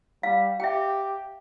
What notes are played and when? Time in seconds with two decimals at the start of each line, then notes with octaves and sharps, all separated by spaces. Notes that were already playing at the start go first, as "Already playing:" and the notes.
0.23 G3 F5
0.60 G4 E5 G5